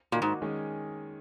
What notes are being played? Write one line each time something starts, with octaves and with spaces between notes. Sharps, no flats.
A#2 D#3 A#3 D#4 F#4
G#2
D#3 G#3 C#4 G#4